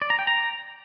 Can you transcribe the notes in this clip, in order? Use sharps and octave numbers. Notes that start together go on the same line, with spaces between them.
D5
A#5
G5
A#5